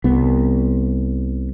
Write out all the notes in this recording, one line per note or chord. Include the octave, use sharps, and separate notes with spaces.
C2 B3